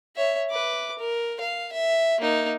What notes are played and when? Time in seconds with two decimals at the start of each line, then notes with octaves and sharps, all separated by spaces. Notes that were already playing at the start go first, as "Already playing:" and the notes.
0.16 C#5 E5
0.50 B4 D6
0.99 A#4
1.41 F5
1.73 E5
2.21 A#3 D#4